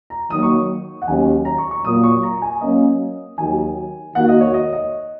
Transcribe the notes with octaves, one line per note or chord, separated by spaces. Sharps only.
A#5
D#3 F#3 A#3 D#6
C#6
F#5
D#2 D#3 F#3 C#4 G#5
A#5
C#6
C#6
A#2 F#3 A#3 D#6
C#6
A#5
G#5
F#3 A#3 C#4 D#5
D#2 D#3 F#3 G#5
D#3 A#3 F#4 F#5
D#5
C#5
D#5
D#5